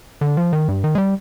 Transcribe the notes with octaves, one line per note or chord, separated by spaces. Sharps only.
D3
F3
D#3
G2
D#3
G#3
G3